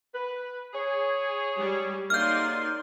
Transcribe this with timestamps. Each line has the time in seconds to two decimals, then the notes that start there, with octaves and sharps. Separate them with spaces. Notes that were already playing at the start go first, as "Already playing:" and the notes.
0.14 B4
0.73 G#4 C#5
1.57 G3 G4
2.10 F#3 G#3 A#3 D#4 D5 C6 F6 G6